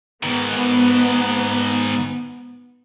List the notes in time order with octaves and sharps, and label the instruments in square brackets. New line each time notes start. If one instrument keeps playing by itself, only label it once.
[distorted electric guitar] G#2 D#3 [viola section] B3